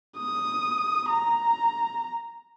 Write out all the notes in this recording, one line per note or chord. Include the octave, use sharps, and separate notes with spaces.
D#6
A#5